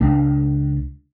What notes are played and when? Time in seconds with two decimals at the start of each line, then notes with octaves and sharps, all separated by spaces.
0.01 C#2 D4